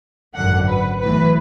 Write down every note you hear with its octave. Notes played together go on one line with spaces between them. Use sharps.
G#1 F#2 D3 F#5
B4
B1 A2 E3 B4